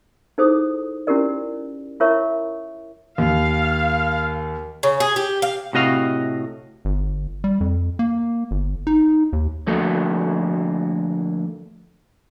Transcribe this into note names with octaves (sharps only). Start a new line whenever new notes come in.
D#4 E4 G#4 A4 C5 D#6
C#4 E4 F#4 G4 A#4 D5
E4 F4 A#4 C#5 E5 C#6
D#2 F5
C#3
G#4
G4
F5
A2 C3 F#4 D#5 F5
G1
G3
F2
A#3
G1
D#4
D#2
D3 F3 A3 A#3 F#4 A4